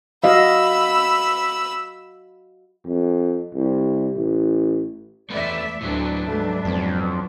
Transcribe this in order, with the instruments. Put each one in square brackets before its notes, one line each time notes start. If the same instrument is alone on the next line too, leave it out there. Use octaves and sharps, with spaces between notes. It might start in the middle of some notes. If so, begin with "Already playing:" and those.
[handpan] F#4 D#5 F5 [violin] B5 E6
[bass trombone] F2
C2
A1
[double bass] E2 [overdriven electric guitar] A3 B4 [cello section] D5 E5
[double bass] D2 [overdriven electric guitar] A2 F#3 [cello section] D4 B4
[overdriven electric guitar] C#2 G#2 [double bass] F#3 A3
[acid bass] F2 [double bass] F#3